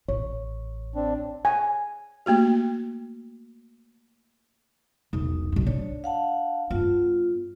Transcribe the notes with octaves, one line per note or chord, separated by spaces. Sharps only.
A1 C#5
C4 D4
G#5
A3 A#3 F#4 G4
E1 B1 D#4
B1 G2
D4 C#5
F5 F#5 A5
G2 B3 F4